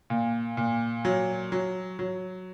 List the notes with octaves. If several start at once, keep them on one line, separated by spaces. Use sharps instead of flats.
A#2
A#2
F#3
F#3
F#3